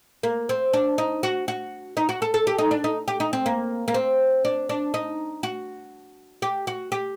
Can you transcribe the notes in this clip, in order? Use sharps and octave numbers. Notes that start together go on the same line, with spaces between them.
A#3
C4
D4
D#4
F#4
F#4
D#4
F#4
A4
A4
G4
D#4
D4
D#4
G4
D#4
C4
A#3
A#3
C4
D4
D4
D#4
F#4
G4
F#4
G4